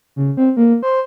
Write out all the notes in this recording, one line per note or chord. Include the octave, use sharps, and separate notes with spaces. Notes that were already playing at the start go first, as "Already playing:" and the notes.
C#3
C4
A#3
C5